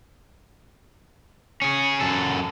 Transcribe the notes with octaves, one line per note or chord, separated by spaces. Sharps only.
C#4 G#4
F#2 A4